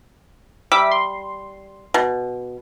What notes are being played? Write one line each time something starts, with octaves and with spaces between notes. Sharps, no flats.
G3 E5 D6 B6
C6
B2